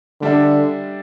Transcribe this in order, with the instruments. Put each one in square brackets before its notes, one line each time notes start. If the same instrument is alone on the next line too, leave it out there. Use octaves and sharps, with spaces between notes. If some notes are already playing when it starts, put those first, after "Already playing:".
[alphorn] D3 [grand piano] G3 D4 A4 E5